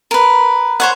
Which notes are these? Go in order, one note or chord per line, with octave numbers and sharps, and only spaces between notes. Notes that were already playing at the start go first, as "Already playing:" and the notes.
A#4 B4
C5 C#5 F#5